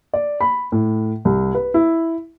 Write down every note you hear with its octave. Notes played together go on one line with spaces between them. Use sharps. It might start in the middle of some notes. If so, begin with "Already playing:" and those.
D5
B5
A2
C2
B4
E4